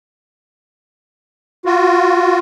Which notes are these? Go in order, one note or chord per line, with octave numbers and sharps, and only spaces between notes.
F4 F#4